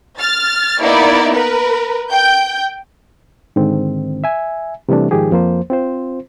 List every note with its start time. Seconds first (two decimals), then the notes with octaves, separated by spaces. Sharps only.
0.18 F6 A6
0.81 A#3 B3 D#4 E4 D5
1.33 A#4 B4
2.11 G5 G6
3.56 G#2 D3 D#3 C4
4.24 E5 G#5
4.89 C3 E3 G3 A3 D4
5.11 G#2 D#3 F3 G4 G#4
5.31 F2 F3 A#3 C5
5.70 C4 F4 C5